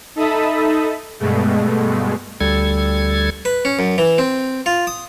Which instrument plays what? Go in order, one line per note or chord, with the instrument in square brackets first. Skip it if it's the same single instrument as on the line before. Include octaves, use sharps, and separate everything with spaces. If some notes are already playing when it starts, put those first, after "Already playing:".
[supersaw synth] D#4 A4 E5 A5 B5 D#6
G2 B2 G#3 A3
[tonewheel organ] D2 G3 A4 G#6
[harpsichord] B4
C#4
F#2
E3
C4
F4
D#6